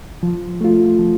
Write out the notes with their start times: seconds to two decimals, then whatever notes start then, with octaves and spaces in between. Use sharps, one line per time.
0.23 F3
0.61 A3 F4
0.99 F3